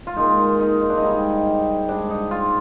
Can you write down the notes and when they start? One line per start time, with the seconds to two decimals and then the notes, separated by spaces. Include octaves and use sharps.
0.07 F4
0.17 A#2 G#3 D#4
0.38 D#4
0.59 D#4
0.81 D#4
0.90 D4
0.98 D#4
1.03 G#2 G3
1.89 G#2 G3 D4
2.10 D#4
2.31 F4